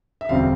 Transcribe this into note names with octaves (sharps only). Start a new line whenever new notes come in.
E5
E1 D2 C3 G3 C4 F5